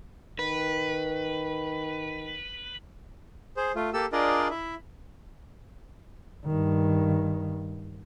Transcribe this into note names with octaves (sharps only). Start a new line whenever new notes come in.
D#3 B4
G#4 C5
A3 F4
A#3 G4 A4 E6
D4 F4 G#4 A#4 D5 D#5
E4 E5
G2 D#3